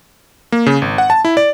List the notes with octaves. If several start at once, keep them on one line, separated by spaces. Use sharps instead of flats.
A#3
C#3
G#1
F#5
A5
E4
D5